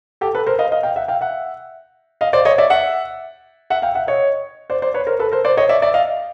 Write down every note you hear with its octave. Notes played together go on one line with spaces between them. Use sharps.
G4 A4
A4 B4
A#4 C5
D#5 F5
D#5 F5
F5 G5
E5 F#5
F5 G5
E5 F#5
D#5 F5
C5 D5
C#5 D#5
D5 E5
E5 F#5
E5 F#5
F5 G5
E5 F#5
C#5 D#5
C5 D5
C5 D5
B4 C#5
A#4 C5
A4 B4
A#4 C5
C5 D5
C#5 D#5
D5 E5
D5 E5
D#5 F5